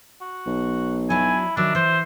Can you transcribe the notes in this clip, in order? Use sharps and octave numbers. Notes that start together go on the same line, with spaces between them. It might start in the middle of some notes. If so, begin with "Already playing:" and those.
F#4
B1
F#3 D4 E4 G#5
D#3 F#3 D4 A#4 E5
E3 C5